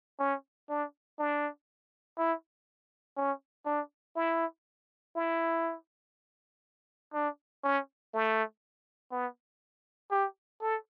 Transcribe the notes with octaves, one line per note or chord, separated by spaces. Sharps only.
C#4
D4
D4
E4
C#4
D4
E4
E4
D4
C#4
A3
B3
G4
A4